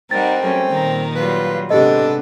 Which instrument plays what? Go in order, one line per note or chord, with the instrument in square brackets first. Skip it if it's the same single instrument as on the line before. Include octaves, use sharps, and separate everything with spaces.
[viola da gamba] G3 A#4 [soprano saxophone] C4 [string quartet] D#4 F#5 [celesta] A6
[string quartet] F#3 A3 C#4
[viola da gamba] A#2 D#3 [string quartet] G3 A#5
[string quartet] F#3 G3 F4 [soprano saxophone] B4
[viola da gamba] G#2 D4 [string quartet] C3 B3 [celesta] G4 D#5 [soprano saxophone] A4